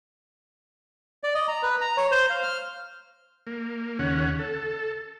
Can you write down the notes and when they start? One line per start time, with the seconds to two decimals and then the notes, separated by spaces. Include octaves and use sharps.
1.23 D5
1.35 D#5
1.48 A#5
1.63 B4
1.81 A#5
1.97 C#5
2.11 C5
2.30 F5
2.43 F6
3.47 A#3
3.99 D#2 C#3 C#4 F#5
4.39 A4